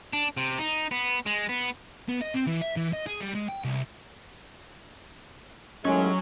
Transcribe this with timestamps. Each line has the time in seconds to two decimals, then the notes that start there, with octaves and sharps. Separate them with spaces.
0.13 D4
0.37 C3
0.58 D#4
0.91 B3
1.26 G#3
1.49 B3
2.09 B3
2.22 D#5
2.35 C4
2.47 E3
2.62 E5
2.77 E3
2.93 D#5
3.07 G#4
3.20 G3
3.34 G#3
3.48 G5
3.64 C2
5.85 D#2 A2 F#3 G#3 C#4 C#5